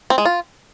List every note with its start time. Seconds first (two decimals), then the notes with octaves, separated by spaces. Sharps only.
0.10 C4
0.18 G#3
0.25 F4